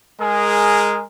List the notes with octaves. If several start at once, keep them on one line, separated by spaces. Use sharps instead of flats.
G#3 G#4 A#4